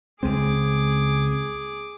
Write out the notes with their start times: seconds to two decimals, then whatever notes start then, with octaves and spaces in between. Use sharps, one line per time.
0.23 C#2 G#3 C4 G#4 D6